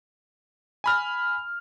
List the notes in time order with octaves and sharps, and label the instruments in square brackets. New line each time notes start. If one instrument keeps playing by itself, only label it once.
[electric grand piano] G#5 B5 F6